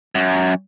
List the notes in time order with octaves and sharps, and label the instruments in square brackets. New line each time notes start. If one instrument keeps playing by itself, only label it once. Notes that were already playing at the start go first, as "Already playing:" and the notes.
[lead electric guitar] F#2